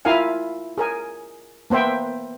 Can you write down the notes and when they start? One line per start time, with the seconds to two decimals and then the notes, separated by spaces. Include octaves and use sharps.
0.05 E4 F4 A#4 F5 G#5
0.78 G#4 A#4 G#5
1.70 A#3 B3 C5 E5 G5